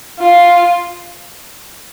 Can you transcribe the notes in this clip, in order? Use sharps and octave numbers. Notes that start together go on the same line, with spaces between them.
F4